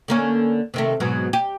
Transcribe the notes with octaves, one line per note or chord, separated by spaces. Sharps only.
D3 A#3 C#4
C3 D#3 A3
G#2 B2 F#3
G4